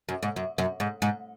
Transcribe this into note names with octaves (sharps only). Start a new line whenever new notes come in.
F#2
G#2
F#2
F#2
G#2
G#2